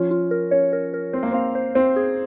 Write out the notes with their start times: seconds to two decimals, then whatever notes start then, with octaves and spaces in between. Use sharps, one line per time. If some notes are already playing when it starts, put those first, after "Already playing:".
Already playing: F3 C#4 F4
0.11 F4
0.31 A#4
0.51 C#4 C#5
0.73 A#4
0.94 A#4
1.13 C4 C5
1.23 A#3
1.32 C4 F5
1.55 C5
1.75 C4 C5
1.96 G#4